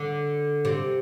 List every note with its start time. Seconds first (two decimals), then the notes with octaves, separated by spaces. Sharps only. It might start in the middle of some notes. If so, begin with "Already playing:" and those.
Already playing: D3
0.65 C3